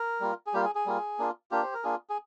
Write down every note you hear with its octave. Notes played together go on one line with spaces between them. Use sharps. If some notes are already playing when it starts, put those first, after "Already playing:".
Already playing: A#4
G3 A#3 F4
G#4
G3 A#3 F4 G4
G#4
G#4
G3 A#3 F4
A#3 D4 F4
A#3 D4 F4 G4
C5
A#4
A#3 D4 F4 G#4
G#4